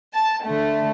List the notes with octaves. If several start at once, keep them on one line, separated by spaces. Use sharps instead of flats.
A5
D3 A3